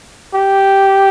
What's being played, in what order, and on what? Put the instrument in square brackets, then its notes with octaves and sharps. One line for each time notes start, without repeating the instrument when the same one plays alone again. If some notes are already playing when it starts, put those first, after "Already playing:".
[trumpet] G4